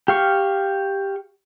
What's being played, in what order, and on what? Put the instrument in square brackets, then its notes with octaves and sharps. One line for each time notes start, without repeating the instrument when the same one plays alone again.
[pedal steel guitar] G4 F5 C#6